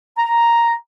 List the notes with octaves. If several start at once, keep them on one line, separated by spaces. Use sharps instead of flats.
A#5